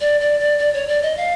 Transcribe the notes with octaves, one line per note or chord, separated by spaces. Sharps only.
D5
D5
D5
D5
C#5
D5
D#5
F5